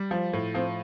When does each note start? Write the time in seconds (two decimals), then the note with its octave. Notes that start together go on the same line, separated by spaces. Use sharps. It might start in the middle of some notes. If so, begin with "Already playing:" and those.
Already playing: G3
0.11 F3
0.33 A2
0.55 F3 C4